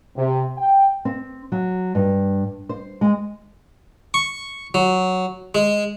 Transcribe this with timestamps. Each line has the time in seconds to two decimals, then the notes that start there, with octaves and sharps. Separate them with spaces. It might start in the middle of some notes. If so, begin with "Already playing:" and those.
0.17 C3
0.58 G5
1.05 C4
1.52 F#3
1.95 G2
2.69 C5
3.01 G#3
4.14 C#6
4.74 F#3
5.55 G#3